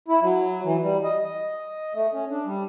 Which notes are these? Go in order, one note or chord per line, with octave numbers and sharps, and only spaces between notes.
E4
F#3
E3
G3
D#5
D#5
A3
C#4
D4
G3